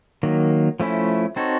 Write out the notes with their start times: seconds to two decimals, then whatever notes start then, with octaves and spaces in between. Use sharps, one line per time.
0.23 D#3 F#3 A#3
0.80 F3 A3 C#4 E4
1.36 C4 D#4 F#4 A4 C#5